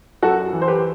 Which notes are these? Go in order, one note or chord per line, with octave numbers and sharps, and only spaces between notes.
F#2 F#4 A4
E3
C5
G4 B4